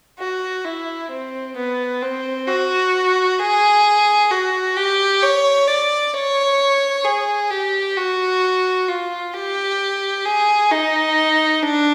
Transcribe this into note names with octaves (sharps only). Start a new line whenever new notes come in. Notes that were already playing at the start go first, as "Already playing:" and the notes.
F#4
E4
C4
B3
C4
F#4
G#4
F#4
G4
C#5
D5
C#5
G#4
G4
F#4
F4
G4
G#4
D#4
D4